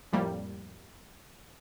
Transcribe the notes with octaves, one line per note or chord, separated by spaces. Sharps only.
F2 A2 G3 A#3